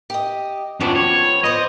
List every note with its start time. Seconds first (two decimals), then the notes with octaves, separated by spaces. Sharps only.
0.10 G4 D#5
0.81 F#2 F3 G3 B3 D4
0.96 C#5
1.44 B4 C5 D5 D#5